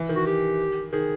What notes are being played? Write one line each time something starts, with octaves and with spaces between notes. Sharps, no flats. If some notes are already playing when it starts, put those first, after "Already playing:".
Already playing: E3
D#3
F#4
G4
D#3 G#4